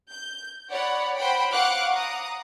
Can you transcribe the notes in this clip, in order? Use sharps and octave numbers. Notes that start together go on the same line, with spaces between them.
G6
C#5 D5 F#5 B5
C5 F#5 G5 B5
F5 F#5 C#6 D6 F#6
A#5 D#6